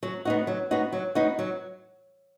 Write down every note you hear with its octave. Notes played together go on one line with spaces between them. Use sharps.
F#3
B3 D#4 F#4
F#3
B3 D#4 F#4
F#3
B3 D#4 F#4
F#3